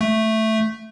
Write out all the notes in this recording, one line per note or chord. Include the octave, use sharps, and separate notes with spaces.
A3